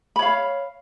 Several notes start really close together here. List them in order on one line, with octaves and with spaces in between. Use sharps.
B5 C#5 F5